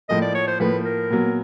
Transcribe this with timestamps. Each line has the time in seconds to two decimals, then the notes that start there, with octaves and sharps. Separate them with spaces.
0.09 A2 F3 A#3 D#5
0.22 D5
0.35 C#5
0.47 C5
0.60 A2 F3 A#3 B4
0.85 A#4
1.11 A#2 F#3 B3